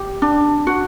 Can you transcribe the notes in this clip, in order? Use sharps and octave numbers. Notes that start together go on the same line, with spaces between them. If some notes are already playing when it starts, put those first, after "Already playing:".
Already playing: G4
D4
F#4